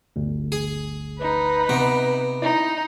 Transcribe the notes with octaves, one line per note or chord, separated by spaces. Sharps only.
G1 D2
G#4
D#4 B4
C3 B3
D#4 E4